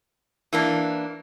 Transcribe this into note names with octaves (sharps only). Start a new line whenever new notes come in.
E3 A#3 D4